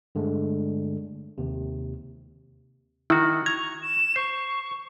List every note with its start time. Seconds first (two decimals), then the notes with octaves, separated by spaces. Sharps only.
0.15 G2 D3 G#3 A3
1.38 D#2 C3
3.10 D#3 E4 F#4
3.46 A#5 C#6 G#6
3.81 E7
4.16 C5 C#6